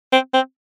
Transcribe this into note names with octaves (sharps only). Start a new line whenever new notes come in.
C4
C4